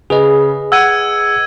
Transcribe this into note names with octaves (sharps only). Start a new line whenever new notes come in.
C#3 G#4 B4 D#5
F#5 E6 G#6 D#7